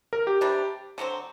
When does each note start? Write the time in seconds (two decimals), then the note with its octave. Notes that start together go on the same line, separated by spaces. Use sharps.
0.13 A#4
0.27 G4
0.41 C3 G3 D4
0.98 D3 F#3 A3 C4